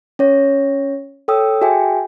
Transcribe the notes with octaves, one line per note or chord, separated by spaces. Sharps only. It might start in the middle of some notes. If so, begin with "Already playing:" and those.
C#4 C#5 A#6
A4 C#5 G5 D#6 E6
F#4 G#4 E5 G5 G#5